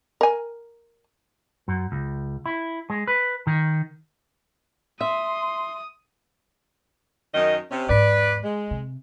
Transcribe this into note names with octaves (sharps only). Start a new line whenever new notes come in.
A#4 G#5
F#2
C#2
E4
G#3
B4
D#3
E5 C6 D#6
F#2 D#3 D#5
C3 C#4
E2 G#2 B4 D5
G#3
C3